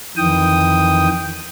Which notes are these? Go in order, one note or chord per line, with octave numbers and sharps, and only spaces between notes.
F2 D#3 E3 G5 D#6